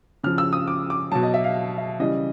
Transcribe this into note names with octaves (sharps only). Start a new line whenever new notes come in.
C#3 F3 F6
E6
D#6
D6
D6
B2 F#3 A5
D#5
E5
F5
E5
C#3 E3 G3 D#5